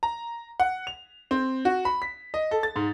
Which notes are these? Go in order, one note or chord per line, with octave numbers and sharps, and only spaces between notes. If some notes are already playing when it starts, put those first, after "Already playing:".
A#5
F#5
F7
C4
F#4
B5
B6
D#5
A4
A6
G#2